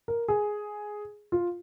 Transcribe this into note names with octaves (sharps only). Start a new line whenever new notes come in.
A#4
G#4
F4